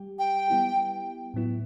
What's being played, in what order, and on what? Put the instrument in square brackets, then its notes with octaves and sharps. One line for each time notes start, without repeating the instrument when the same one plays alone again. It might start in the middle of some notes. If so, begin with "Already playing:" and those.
Already playing: [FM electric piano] G3 G4
[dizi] G5
[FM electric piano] G3 B3 E4 G4
A2 F#3 B3 E4